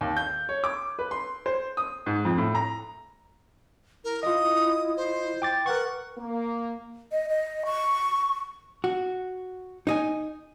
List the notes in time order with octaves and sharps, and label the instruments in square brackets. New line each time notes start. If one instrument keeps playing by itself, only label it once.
[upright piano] D#2
G6
C#5
D6
B4
C6
C5
D#6
G#2
F2
A2
A#5
[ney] E4 [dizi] A#4
[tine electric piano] F4 D#5 [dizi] D#6
[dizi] C5
[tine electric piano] G5 D6 A6
[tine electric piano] A#4 C#6 [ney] B4 [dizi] F#5
[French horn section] A#3
[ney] D#5
D#5
C#6
[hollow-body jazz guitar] F#4
D#4 D#5 G#5